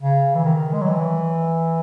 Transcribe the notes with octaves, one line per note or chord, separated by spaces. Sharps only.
C#3
E3
D#3
G#3
F#3
E3